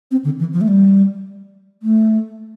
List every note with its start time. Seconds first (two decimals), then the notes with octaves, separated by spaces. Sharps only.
0.11 C4
0.24 D3
0.39 E3
0.53 F3
0.61 A3
0.68 G3
1.83 A3